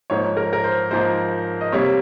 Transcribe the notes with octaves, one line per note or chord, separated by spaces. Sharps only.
G#2 F3 A#3 C#5
A#4
A#4
C5
G#2 F3 A#3 C5
D#5
C3 G3 A#3 C#5